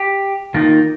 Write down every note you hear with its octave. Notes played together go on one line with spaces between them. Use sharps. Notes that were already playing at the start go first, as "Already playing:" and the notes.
Already playing: G4
D#3 A#3 D#4 F4 A#4